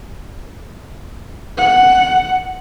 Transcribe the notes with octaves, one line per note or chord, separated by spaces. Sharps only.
F#5